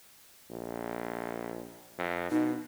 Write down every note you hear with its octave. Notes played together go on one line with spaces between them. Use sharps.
A#1
F2
B2 D#4